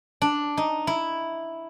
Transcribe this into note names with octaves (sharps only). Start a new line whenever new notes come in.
D4
D#4
E4